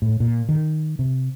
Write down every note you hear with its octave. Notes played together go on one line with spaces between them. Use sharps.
A2
A#2
D#3
C3